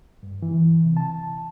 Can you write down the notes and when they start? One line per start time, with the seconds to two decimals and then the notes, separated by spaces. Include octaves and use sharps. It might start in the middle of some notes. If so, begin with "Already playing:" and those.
0.23 G2
0.42 E3
0.84 C3
0.97 A5